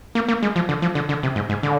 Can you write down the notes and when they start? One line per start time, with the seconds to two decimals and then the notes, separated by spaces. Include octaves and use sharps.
0.15 A#3
0.29 A#3
0.43 G#3
0.56 F3
0.69 D3
0.82 F3
0.95 D3
1.09 D3
1.23 C3
1.36 G#2
1.49 G#2
1.63 D3